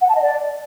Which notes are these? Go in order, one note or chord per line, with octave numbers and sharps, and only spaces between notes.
F#5
A5
D#5
D5